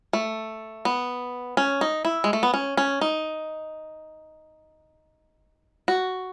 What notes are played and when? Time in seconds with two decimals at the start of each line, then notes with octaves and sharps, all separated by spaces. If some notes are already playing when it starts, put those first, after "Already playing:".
0.13 A3
0.85 B3
1.57 C#4
1.81 D#4
2.05 E4
2.24 G#3
2.33 A3
2.43 B3
2.54 C#4
2.77 C#4
3.01 D#4
5.88 F#4